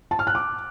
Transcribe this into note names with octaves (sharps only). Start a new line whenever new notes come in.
A5
F6
F#6
D6